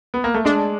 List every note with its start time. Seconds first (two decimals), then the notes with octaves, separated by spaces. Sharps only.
0.14 B3
0.24 A#3
0.34 A3
0.45 G#3 D4